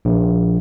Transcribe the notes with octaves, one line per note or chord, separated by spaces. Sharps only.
A#1